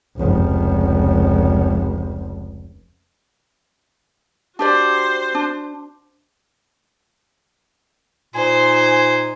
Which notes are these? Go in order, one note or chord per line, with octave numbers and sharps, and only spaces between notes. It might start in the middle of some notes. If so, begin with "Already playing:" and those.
F1 C#2
D4 F#4 G4 C5 D5
D4
A#2 D#4 C5 G#5